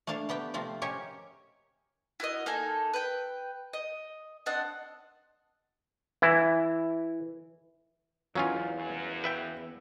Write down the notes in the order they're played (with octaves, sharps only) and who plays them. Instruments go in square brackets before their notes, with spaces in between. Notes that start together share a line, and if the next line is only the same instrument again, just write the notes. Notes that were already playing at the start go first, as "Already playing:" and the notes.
[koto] A3 A#3 D4 F5 A5
A3 B3 G4 G5
C3 F3 A3 C4 F4
A#3 C#4 G4 C#5 D#5 E5
[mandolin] E4 F#4 A#4 D#5
A#3 D#4 A4 G#5
B4 G5
D#5
C4 D4 D#5 F#5
[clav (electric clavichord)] E3 E4
[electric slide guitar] E2 [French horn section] G#2 [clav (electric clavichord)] F#3 C#4 F4 [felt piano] F5 G#5
[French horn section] F#2
[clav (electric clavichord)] B4 E5 G5